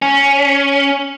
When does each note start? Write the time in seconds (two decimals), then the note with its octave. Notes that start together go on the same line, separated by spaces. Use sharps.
0.02 C#4